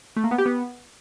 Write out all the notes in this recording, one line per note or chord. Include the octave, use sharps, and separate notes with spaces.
A3
A#3
B3
G4
B3